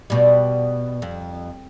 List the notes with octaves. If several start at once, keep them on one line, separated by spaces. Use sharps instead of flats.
B2 G3
F2